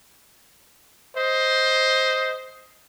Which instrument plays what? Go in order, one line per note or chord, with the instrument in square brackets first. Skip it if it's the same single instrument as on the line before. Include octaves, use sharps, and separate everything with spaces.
[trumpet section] C5 D#5